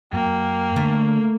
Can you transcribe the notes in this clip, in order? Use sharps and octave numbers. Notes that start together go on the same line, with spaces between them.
F#2 A#3 G5
D3 A3